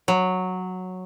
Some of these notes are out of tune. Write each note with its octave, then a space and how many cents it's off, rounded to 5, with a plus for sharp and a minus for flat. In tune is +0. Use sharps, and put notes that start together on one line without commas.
F#3 -5